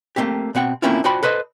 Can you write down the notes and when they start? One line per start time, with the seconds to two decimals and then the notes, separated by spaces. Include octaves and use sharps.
0.16 A3 A#3 C4 G4
0.55 B2 C4 F#5 G5
0.82 A3 A#3 C4 C#4 E4 F4
1.04 D4 F4 F#4 C5 G5 B5
1.23 A4 B4 C5 D#5